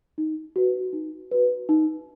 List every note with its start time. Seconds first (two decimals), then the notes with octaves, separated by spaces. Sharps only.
0.18 D#4
0.56 F#4 B4
0.93 D#4
1.31 F#4 B4
1.69 D#4